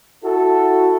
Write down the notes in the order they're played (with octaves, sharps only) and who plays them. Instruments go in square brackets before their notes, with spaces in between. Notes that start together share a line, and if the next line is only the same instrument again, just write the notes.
[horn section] E4 F#4 A4